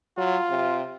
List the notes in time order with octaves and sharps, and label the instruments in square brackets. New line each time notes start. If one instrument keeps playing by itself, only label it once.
[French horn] F#3 [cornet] F4
[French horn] C3